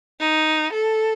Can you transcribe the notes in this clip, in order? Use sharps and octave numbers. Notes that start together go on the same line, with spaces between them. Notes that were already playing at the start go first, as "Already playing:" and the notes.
D#4
A4